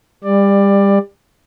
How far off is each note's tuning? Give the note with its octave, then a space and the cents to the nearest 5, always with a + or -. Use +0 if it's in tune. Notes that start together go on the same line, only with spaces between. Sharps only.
G3 +30 D5 +15